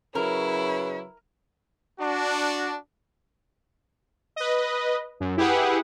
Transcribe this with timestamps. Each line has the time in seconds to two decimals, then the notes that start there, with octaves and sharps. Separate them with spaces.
0.15 C#3 F#3 E4 A#4 B4
2.00 D4 F#4
4.36 B4 D#5
5.20 F#2
5.37 E4 G4 G#4 B4 F#5